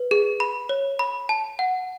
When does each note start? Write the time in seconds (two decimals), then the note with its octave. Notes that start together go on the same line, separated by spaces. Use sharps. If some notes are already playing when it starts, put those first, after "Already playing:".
Already playing: B4
0.11 G#4
0.40 B5
0.69 C#5
0.99 B5
1.29 A5
1.59 F#5